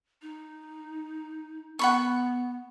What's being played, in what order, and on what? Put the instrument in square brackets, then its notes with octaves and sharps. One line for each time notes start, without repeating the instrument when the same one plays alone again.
[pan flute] D#4
[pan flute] B3 [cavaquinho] F#5 B5 C#6